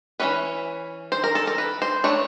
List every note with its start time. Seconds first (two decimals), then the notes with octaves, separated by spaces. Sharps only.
0.20 E3 G#3 C#4 B4
1.12 C5
1.24 A#4
1.35 A4
1.47 A#4
1.58 B4
1.82 C5
2.04 E3 A3 D4 C#5